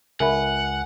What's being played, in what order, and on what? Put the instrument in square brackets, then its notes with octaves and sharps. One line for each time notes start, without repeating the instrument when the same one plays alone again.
[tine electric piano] C#2 [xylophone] A#4 E5 B5 [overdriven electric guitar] F#5 [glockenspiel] G#5